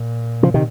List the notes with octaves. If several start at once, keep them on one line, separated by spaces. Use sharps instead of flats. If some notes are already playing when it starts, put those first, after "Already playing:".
Already playing: A#2
C#3 F3
C3 D#3